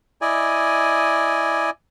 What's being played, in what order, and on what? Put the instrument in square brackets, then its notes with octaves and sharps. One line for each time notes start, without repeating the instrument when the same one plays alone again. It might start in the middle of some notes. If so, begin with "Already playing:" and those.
[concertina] E4 D5 D#5 G#5